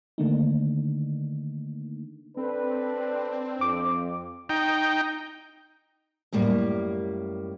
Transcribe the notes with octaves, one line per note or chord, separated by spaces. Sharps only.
D3 D#3 A3 A#3 D4 D#4
C4 D4 A4 B4
F2 D6
D#4 G5
F#2 A2 G3 A#3